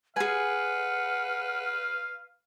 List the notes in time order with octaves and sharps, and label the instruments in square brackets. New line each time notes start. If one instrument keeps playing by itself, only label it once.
[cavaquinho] G#4 G#5 [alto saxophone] B4 [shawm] F5 [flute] F#5